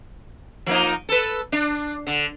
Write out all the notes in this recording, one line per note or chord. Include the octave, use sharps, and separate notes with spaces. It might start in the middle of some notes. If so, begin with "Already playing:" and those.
F3 A#3 D#4
A4 B4
D4
D3